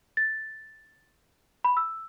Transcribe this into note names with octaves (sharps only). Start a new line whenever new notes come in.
A6
B5
E6